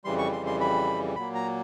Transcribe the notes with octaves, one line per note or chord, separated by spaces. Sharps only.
F2 C#3 E3 G3 C6
C#6
C6
C6
B5
A#2 F#3 A#3 B5
A#5